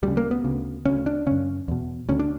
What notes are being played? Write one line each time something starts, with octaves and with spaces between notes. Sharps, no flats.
D2 C#3 G3
A#3
B3
D2 C#3
D2 C#3 C#4
D4
F#2 C#3 C#4
E2 B2
D2 D3 C#4
D4